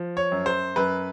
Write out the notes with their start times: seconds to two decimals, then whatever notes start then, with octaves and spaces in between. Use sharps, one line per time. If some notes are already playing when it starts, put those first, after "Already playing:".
Already playing: F3
0.17 C#5
0.32 F#2
0.46 C5
0.76 F#2 B4